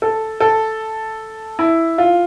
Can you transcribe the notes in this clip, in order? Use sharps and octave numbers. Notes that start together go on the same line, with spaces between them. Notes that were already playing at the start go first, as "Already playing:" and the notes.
A4
A4
E4
F4